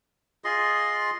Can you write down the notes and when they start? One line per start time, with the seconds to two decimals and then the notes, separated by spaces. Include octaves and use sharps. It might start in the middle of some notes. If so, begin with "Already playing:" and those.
0.44 F4 G#4 D#5 C6